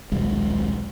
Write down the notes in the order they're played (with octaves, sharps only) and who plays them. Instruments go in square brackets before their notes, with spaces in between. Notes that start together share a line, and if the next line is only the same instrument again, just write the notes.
[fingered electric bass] D#1 B1 G#3